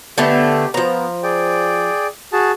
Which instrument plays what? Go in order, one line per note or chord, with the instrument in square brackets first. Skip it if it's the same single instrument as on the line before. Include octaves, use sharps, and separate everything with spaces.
[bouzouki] D3 A3 B3 [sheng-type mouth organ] G4
[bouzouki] F3 A#5 [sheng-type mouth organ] B3
[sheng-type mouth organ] G#4 D5 G5
F#4 G#4 A5